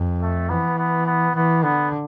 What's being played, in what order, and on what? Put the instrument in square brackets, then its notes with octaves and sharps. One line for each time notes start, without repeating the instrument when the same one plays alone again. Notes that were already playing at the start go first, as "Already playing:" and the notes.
Already playing: [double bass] F2
[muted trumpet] A3
[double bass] E3 [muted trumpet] B3
[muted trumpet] B3
B3
[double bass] E3 [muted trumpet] B3
[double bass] D3 [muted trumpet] B3